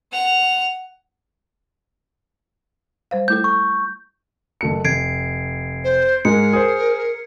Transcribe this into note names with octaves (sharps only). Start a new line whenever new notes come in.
F#5 F7
G3 C5 F5
A3 E4 A4 G6
C#6
F#1 A3 C#7
F1 G#6 C7 D7
C5
G#2 G#3 G#4 A#4 C#7
G#4 C5